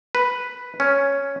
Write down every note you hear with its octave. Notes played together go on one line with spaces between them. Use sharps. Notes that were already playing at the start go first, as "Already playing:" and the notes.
B4
C#4